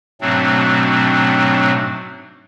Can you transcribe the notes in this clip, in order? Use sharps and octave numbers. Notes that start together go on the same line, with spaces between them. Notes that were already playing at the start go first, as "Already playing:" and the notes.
G#2 B2 F#3 A3 C4 D4